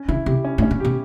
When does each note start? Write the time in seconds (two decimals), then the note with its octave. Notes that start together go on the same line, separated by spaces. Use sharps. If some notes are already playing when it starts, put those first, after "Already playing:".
Already playing: C#4
0.08 C#3 E4
0.26 C3 G4
0.45 C#4
0.58 A2
0.62 C#4
0.71 A#2
0.80 B2 G4